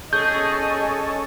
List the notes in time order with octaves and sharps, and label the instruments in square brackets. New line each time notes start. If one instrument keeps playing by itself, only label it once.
[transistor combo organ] C#4 A4 [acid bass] G#4 [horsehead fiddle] D#5 [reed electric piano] G6